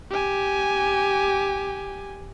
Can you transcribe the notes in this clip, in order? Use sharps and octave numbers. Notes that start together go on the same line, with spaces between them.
G4 G#5